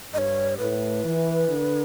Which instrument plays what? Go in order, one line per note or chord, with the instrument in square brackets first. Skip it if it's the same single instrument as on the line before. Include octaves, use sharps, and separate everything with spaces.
[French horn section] G2 [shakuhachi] C#5 D#5
[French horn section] A2 [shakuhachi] B4
[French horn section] E3
D3